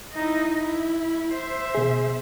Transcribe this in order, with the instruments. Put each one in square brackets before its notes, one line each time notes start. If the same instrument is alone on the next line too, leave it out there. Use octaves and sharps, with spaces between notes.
[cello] D#4 E4
E4
C5 E5
[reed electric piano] B2 G#4